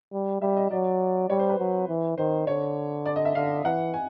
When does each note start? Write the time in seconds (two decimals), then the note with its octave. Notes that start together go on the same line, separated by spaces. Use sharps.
0.13 G3
0.41 G3 E5
0.56 D#5
0.71 F#3 D5
1.30 G3 C#5
1.39 C5
1.49 B4
1.59 F#3
1.89 E3
2.18 D#3 C5
2.47 D3 C#5
3.06 D5
3.16 D#5
3.25 E5
3.35 D3 F5
3.64 E3 F#5
3.94 G#5